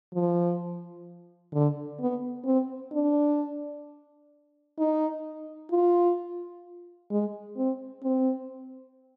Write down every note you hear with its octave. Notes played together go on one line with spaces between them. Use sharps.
F3
D3
B3
C4
D4
D#4
F4
G#3
C4
C4